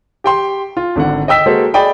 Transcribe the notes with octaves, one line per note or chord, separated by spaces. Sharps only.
G4 G5 C6
F4
G#1 D3 F#5
D#5 G5 E6 B6
G#3 A#3 F#4 A4 C5
G#4 D5 D#5 G5 B5